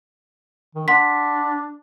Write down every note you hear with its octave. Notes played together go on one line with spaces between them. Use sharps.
D#3
D4 F#5 C6 B6